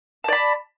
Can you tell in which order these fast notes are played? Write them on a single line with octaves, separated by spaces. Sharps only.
A5 D5 B5